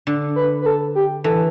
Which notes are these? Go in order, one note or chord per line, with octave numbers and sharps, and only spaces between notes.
D3
B4
B4
A4
G4
E3 A4